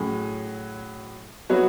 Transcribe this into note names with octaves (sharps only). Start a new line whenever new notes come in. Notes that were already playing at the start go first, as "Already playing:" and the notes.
Already playing: A2 F#3 C#4 G#4
F#3 B3 F#4 C#5